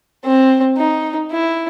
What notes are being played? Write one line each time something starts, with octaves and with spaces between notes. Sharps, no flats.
C4
D#4
E4